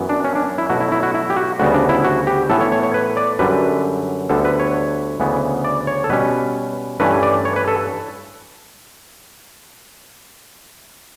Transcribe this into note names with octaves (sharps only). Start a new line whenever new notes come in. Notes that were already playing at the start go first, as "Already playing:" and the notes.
Already playing: F#2 E3 B3
D4
C#4
D4
E4
B2 F#3 A3 F#4
E4
E4
F#4
E4
G4
F#4
D2 C#3 G3 B3 F#4
D4
E4
F#4
G4
A2 E3 B3 A4
C#5
C#5
C#5
B4
D5
F#2 D3 G3 B4
D2 D3 G3 B3 A4
B4
C#5
D2 C#3 E3 B3
D5
C#5
A4
B2 G3 C#4 B4
G2 E3 A3 C#4 B4
D5
C#5
B4
A4